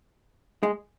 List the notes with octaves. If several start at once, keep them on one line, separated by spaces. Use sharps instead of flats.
G#3